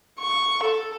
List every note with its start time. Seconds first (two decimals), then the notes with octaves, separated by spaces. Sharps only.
0.19 C#6
0.63 A4